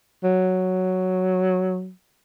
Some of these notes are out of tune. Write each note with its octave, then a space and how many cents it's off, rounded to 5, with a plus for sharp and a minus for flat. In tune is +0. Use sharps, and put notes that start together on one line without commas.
F#3 +0